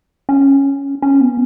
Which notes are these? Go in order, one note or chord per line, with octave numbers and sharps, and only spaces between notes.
C#4
C#4
B3